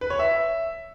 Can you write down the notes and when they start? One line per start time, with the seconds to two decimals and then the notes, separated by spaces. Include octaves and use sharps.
0.01 B4
0.10 C#5
0.19 E5